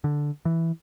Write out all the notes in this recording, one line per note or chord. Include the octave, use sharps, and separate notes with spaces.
D3
E3